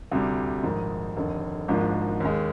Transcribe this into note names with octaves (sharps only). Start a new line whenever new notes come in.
D2 C3 G3
A#1 G#2 D#3
F1 D#2 D3
G#1 G#2 F3 A#3 D4
D#2 D#3 G#3